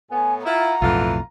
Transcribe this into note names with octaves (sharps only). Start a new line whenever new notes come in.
A2 B3 G#5
E4 F4 F#5 A#5
B1 F2 A2 D3 E3 F4